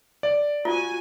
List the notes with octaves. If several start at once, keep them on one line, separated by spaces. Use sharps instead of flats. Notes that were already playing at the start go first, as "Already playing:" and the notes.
D5
F4 F#4 G#5